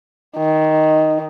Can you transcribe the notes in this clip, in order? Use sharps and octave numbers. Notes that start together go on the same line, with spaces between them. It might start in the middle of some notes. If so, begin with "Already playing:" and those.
D#3